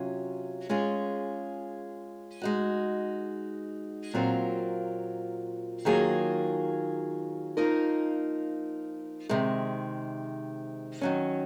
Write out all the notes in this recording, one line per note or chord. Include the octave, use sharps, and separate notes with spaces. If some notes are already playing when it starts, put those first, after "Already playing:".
Already playing: C3 F#3 C#4 F4
G#3 C#4 F4 G#4
G#3 D#4 F#4
A#2 F#3 C4 F4 A#4
D#3 F#3 A#3 F4 G#4
F3 A#3 D#4 A#4
C3 D#3 G#3
D#3 F#3 C#4